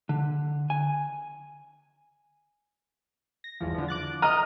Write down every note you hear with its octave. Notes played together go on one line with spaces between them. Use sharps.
D3
G#5
A#6
G1 E2 F3
D3 F3
D6 F#6 A6
D#5 A#5 D#6 F6